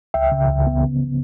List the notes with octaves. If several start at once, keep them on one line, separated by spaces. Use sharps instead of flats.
C#2 E5 G5
C#3
C#2
B3
C#3